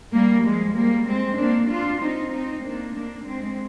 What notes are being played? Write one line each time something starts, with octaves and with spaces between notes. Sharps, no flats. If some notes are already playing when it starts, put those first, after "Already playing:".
G3 A#3
F3 G#3
G3 A#3
G#3 C4
A#3 D4
D4 F4
C4 D#4
C4 D#4
A#3 D4
A#3 D4
G#3 C4